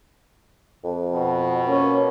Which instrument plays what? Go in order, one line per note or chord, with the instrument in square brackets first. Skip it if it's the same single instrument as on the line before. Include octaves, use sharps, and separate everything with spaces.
[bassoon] F2
[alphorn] B2
[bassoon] A#3 [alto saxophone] C#4